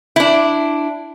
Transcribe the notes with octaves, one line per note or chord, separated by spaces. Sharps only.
D4 E4